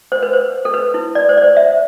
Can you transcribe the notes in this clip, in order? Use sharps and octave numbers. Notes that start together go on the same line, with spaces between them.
C5
B4
C5
A4
B4
E4
D5
C5
D5
C5
E5